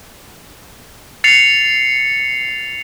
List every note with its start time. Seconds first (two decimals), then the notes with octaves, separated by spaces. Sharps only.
1.24 A6 C7 C#7 F7